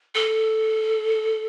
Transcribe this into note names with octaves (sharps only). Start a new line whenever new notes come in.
A4